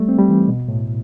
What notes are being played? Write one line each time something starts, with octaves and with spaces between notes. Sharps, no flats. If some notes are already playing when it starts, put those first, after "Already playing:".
Already playing: G3 A3
C4
G3
E3
B2
A2